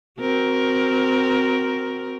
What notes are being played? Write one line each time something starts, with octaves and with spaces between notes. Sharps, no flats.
C4 F#4 A#4